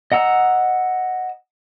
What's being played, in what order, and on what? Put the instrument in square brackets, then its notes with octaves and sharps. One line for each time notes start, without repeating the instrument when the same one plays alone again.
[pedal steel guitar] D#5 F#5 A#5 E6